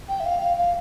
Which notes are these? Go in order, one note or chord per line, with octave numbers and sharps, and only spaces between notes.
G5
E5
F5
F5
F5